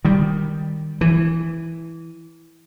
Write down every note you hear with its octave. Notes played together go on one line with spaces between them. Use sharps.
D#3 G3
E3